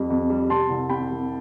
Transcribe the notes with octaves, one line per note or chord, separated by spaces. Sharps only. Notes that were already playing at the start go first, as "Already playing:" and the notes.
Already playing: F2 G3
F2
G3
C3 A5 C6
C2
C3 G5 B5
C2